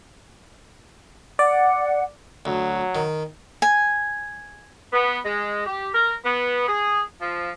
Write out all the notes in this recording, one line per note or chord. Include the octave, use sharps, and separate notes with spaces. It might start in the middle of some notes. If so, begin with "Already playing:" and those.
D5 F#5
D2 F#3
D#3
G#5
B3
G#3
G4
A#4
B3
G#4
F3